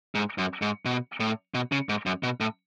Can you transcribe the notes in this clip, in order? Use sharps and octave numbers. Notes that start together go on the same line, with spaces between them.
G#2
F#2
G#2
B2
A2
B2
C#3
G#2
F#2
B2
A2